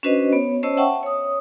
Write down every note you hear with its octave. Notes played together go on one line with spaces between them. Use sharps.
C#4 D4 F#4 B4 C5 D#5
B3 C#5
C#4 C5 C#5 D#5 A5 E6
E5 F#5 G5 A5 C#6
C#5 D#6